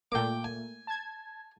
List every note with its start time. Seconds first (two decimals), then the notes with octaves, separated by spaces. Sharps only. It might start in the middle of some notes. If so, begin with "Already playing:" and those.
0.12 A#2 A3 A#3 G5 D6
0.44 G#5
0.87 A5 G#6